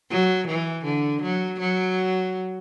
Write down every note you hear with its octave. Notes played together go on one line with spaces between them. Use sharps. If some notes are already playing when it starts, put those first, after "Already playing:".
F#3
E3
D3
F#3
F#3